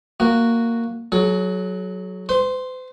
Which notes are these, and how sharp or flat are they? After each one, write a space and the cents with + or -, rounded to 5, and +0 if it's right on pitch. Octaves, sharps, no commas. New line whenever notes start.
A#3 -10 F#4 +0
F#3 +0 G#4 +45
C5 -45 C6 +0